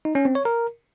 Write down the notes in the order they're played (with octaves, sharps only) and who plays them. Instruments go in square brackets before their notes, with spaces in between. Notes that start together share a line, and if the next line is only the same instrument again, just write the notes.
[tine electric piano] D#4
C#4
C4
C#5
A#4